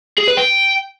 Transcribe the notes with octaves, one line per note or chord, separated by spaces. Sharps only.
G#4
B4
G5